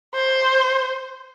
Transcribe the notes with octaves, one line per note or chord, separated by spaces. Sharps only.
C5